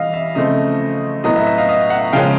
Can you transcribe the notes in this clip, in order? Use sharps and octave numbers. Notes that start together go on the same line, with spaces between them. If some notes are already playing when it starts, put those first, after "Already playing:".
Already playing: E3 G3 D#5 F5
E5
C#3 F3 A3 C4 D#5
A2 F#3 B3 D#5
E5
E5
D#5 F5
D#5 F5
E5 F#5
C#3 F3 G#3 C#4 F5 G5